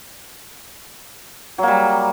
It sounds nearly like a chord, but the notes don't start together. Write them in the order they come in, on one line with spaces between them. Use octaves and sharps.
F#3 A#3 G3